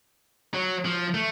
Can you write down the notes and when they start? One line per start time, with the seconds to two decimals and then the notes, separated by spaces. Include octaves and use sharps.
0.54 F#3
0.85 F3
1.14 A3